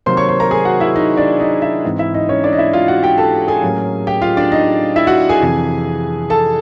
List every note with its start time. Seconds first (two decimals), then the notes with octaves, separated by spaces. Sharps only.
0.06 C3 D#3 F#3 A#3 C5 C6
0.17 C#5 C#6
0.28 C5 C6
0.40 A#4 A#5
0.51 G#4 G#5
0.65 F#4 F#5
0.80 E4 E5
0.96 D#4 D#5
1.17 D4 D5
1.40 D#4 D#5
1.62 E4 E5
1.84 G#2 E3 G#3 C4
1.99 E4 E5
2.14 D#4 D#5
2.29 C#4 C#5
2.44 D4 D5
2.53 D#5
2.58 E4 E5
2.73 F4 F5
2.88 F#4 F#5
3.03 G4 G5
3.18 A4 A5
3.48 G#4 G#5
3.63 A2 F#3 A#3 C#4
4.07 G4 G5
4.22 F4 F5
4.37 D4 D5
4.52 D#4 D#5
4.96 E4 E5
5.07 F#4 F#5
5.29 G#4 G#5
5.41 F2 C3 E3
6.30 A4 A5